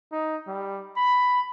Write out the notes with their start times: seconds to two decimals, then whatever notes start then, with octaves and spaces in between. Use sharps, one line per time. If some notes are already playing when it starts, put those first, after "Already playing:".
0.12 D#4
0.47 G3
0.97 B5